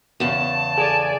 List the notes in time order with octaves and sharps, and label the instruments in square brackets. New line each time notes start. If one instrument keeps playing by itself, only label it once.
[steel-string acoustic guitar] E2 C#3 [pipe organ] A5
[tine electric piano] G#4 A4 [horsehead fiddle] D5 G#5